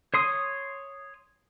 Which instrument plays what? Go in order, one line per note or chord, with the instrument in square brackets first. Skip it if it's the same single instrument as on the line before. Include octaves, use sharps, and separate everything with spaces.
[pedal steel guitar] C#5 C6 D#6